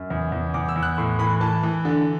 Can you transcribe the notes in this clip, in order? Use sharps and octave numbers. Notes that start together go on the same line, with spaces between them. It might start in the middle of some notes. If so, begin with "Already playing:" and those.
Already playing: F#2
E2
E2
E2 D6
E6
E2
F#6
A2
E3 B5
E3 A5
E3
D3